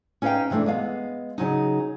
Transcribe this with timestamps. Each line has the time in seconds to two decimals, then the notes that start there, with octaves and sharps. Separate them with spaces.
0.22 C#4 D#4 B4 D5 F5 G5
0.50 C3 E3 G#3 A3 D4
0.66 G#3 B3 F5
1.38 C#3 F#3 D#4